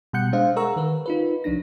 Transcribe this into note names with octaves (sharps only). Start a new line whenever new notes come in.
B2 G3 F#5 F#6 G6 C#7
G#3 D4 C5 D#5 F5
G#4 A#4 F#5 A#5 C#6 E6
D#3 A#4 B4
D#4 F4 B4
C2 F3 D4 D#4 A#6